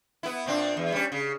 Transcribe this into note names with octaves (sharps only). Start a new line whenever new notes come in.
B3 E4
A#2 C4 D4
E2
G3 C#4
C#3